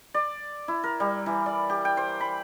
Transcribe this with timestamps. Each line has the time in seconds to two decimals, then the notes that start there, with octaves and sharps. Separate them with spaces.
0.14 D5
0.68 E4
0.84 A#4
1.00 G3
1.26 E3
1.46 D5
1.70 G4
1.85 G5
1.97 C5
2.21 B5